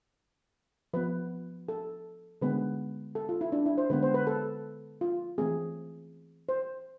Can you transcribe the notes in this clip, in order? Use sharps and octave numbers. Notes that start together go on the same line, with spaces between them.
F3 B3 B4
A4
D3 G#3 B3 B4
A4
F4
E4
D4
E4
C5
D3 G#3 B3 B4
C5
B4
A4
F4
E3 A3 C4 G#4
C5